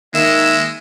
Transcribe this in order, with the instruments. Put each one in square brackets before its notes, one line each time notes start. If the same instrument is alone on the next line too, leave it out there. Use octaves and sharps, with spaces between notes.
[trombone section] D#3 A#3 [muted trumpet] G#3 [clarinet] E5 [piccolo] E7